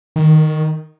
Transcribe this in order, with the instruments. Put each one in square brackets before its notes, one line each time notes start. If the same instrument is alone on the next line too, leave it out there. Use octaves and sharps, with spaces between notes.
[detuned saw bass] D#3